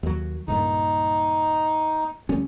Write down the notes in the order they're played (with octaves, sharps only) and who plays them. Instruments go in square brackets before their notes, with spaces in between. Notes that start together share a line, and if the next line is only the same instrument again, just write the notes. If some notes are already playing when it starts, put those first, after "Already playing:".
[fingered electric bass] D#2 F#3
[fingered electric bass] C#2 G2 A#2 [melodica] D#4
[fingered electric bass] D2 G3 C#4